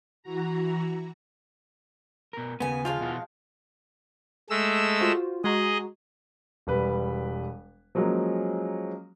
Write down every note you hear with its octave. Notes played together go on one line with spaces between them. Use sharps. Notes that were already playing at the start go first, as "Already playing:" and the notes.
E3 F#4 A#5
B2 A#4
D#2 C#3 B3 G#5
F3 G#3 F4 F5
B2 E4 F#4
G#3 A3 E6
F4 F#4 C5
G#3 F#4 G#4 D#5 A#5
E1 G3 B4
F3 F#3 G#3 A#3 C#4